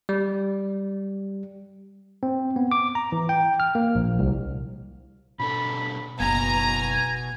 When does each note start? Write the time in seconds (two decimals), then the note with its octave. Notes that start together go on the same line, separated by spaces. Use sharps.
0.09 G3
2.23 C4
2.56 B3
2.72 D6
2.95 A#5
3.12 E3
3.29 G5
3.60 F6
3.75 A#3
3.95 A#1
4.19 C2
5.39 B2 D4 A4 B5
6.20 F#1 B2 B3 D#4 G#5 A#5